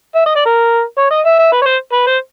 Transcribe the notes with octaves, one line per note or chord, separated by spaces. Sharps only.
E5
D#5
D5
A#4
C#5
D#5
E5
E5
B4
C#5
C5
B4
C5